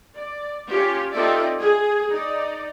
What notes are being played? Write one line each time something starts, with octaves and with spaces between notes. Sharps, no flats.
D5
C#4 F4 G4
C4 D#4 F4 A4 D5 E5
G#4
D#4 D5